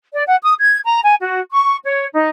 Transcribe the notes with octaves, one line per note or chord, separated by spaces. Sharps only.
D5
F#5
D#6
G#6
A#5
G#5
F#4
C#6
C#5
D#4